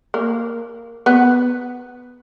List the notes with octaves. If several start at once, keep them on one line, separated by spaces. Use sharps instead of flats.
A#3
B3